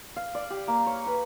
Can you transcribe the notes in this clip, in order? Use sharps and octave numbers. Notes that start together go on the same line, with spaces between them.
F5
D5
G4
A#3
C#5
B4